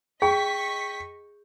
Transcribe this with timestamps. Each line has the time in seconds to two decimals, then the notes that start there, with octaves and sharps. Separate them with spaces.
0.22 G#4 D#5 G5 C#6 B6